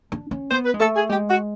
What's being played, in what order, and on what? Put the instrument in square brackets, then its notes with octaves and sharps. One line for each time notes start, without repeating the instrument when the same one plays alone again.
[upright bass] D4
C#4
[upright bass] B3 [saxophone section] C5
[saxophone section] B4
[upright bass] G#3
[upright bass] A3 [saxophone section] A4
[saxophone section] G#4
[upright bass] G#3 [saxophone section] G4
[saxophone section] F#4